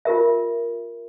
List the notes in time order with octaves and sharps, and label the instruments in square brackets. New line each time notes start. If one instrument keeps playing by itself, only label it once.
[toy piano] F4 G4 A#4 E5